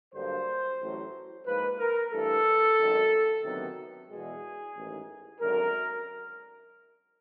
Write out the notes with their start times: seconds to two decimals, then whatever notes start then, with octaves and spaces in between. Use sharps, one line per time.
0.13 G2 D3 F#3 A#3 C5
0.79 A1 A2 F#3
1.45 G#2 F3 A#3 B4
1.79 A#4
2.11 G2 E3 A3 A4
2.77 G#1 F#2 D#3
3.43 D2 C3 D#3 F#3 B3
4.09 E2 B2 G#3 G#4
4.75 A1 G#2 D#3
5.41 G#1 F#2 D3 A#4